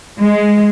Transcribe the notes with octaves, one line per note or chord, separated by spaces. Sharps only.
G#3